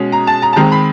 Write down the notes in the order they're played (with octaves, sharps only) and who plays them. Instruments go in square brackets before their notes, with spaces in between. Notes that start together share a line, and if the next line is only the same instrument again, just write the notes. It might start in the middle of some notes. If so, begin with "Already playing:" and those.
Already playing: [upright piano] B2 G#3 C#4
A#5
A5
A#5
A5
D#3 G#3 C4 A#5
B5